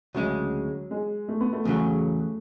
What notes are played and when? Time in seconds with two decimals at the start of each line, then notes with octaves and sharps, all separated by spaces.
0.14 D2 C#3 F#3 G#3
0.91 G#3
1.28 A3
1.40 B3
1.53 A3
1.65 E2 C#3 F#3 A3